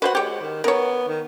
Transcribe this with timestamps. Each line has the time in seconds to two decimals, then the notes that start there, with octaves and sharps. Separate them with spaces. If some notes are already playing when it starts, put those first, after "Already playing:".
0.02 F#4 B4 C5 F#5
0.15 G#3 G4 C#5
0.41 D#3
0.64 B3 A#4 C#5
1.08 D#3